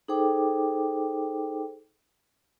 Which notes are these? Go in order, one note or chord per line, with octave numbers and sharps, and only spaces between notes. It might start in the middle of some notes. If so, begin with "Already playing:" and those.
D#4 G#4 A4 C5 G5 D6